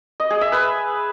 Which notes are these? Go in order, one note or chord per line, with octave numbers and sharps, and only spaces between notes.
D#5
G#4
E5
B4